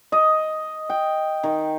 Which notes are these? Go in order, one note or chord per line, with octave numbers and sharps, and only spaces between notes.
D#5
G5
D#3